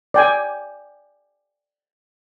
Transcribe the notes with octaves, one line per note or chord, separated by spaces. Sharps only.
D5 G5 G#5